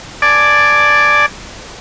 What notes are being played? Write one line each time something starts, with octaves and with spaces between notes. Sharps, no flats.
D5 G#5 A5 D6